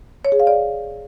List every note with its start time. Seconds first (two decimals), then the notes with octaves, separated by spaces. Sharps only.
0.25 C#5
0.32 G#4
0.40 F5
0.47 D5